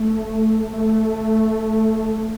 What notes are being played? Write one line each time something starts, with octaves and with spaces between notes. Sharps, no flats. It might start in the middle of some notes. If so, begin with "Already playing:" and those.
Already playing: A3
A3